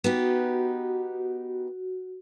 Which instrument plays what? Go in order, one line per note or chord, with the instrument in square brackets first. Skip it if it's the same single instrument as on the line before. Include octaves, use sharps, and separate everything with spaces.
[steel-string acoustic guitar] B3 D#4 G4 [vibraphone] F#4